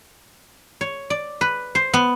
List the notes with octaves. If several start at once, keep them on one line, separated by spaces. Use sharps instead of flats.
C#5
D5
B4
C5
B3